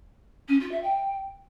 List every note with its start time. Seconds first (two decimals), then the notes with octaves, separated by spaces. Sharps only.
0.48 C#4
0.59 F4
0.71 E5
0.82 G5